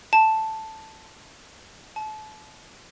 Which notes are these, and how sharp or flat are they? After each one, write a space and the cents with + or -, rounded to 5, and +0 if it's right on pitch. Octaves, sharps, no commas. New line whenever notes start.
A5 +0
A5 -35